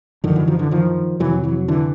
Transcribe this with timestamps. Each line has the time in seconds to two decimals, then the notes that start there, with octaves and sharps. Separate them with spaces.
0.24 F#2 D3 D#3 F3
0.36 E3 F#3
0.47 D#3 F3
0.59 D3 E3
0.71 D#3 F3
1.20 F2 C3 E3 F#3
1.44 E3 F#3
1.68 D3 E3